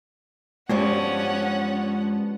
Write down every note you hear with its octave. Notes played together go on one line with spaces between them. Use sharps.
G2 F3 G#3 B3 C#4 F#5